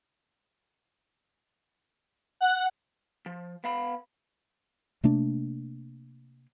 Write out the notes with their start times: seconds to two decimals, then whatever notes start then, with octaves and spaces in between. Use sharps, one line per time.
2.41 F#5
3.26 F3
3.64 B3 F5 B5
5.04 C3 A3 A#3 D4